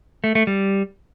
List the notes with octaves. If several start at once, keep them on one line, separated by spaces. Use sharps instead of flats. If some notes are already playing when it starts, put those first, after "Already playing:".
A3
A3
G3